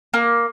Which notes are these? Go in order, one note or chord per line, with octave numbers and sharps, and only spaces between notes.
A#3